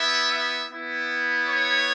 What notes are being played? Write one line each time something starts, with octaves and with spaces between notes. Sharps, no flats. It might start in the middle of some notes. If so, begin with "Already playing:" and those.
Already playing: B3 E4 E5
E5
B3 E4
C#5